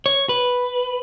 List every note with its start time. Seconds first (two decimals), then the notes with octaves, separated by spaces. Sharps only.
0.06 C#5
0.29 B4